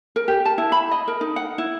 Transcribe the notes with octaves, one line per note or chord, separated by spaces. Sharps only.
A#4
G4
A5
E4
B5
D#5
A#4
D#4
F#5
E4